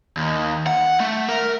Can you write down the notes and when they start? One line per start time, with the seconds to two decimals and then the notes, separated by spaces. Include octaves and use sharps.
0.17 D#2
0.67 F#5
1.00 A3
1.29 A#4